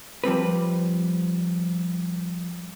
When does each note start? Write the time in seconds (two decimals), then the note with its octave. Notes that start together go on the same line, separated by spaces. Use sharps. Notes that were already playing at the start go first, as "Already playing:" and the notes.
0.24 F3 G3 C4 B4